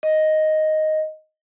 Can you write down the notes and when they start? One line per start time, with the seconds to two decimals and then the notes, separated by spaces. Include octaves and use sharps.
0.03 D#5